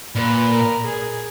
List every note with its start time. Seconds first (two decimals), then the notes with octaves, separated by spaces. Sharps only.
0.15 A#2 B4
0.51 A#4
0.85 G#4